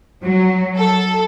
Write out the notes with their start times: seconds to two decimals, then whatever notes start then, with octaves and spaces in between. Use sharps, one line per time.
0.23 F#3
0.76 A4